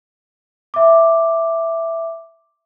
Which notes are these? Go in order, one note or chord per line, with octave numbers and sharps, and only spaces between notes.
E5 D6